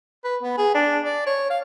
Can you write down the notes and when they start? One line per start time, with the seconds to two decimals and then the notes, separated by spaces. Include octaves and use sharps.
0.24 B4
0.43 B3
0.58 G#4
0.75 D4
1.05 D5
1.27 C#5
1.50 F5